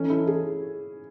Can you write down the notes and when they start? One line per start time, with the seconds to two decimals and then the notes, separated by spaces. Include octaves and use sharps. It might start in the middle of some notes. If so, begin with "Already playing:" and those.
Already playing: E3 A3 C#4 D#4 A4
0.10 E4
0.27 G#4